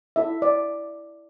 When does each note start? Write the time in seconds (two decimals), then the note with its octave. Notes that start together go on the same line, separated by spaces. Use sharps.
0.16 E4 A4 E5
0.42 D5